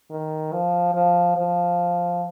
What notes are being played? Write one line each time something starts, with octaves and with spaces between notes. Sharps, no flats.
D#3
F3
F3
F3